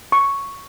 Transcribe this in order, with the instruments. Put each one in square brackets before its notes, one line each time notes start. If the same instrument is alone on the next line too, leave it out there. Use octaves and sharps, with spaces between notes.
[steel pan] C#6